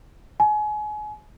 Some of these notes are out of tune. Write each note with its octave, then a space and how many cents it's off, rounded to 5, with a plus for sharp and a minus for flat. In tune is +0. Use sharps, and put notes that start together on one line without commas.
G#5 +30